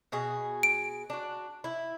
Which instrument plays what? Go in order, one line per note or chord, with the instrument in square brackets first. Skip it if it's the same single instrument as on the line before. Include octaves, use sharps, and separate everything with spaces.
[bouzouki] B2 F#4 G#4
[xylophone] D7
[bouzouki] D4 F#4
E4